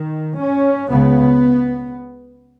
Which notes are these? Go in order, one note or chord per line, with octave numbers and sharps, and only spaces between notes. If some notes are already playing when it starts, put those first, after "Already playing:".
Already playing: D#3
C#4
C#2 C#3 B3